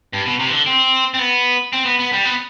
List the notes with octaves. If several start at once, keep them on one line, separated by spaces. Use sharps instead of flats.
G2
B2
C3
E3
D3
C4
C4
B3
C4
B3
B3
G3
B3